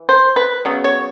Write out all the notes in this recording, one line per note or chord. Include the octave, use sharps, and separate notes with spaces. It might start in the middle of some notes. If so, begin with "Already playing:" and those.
Already playing: E3
C5
B4
C#3 F#3 B3
C#5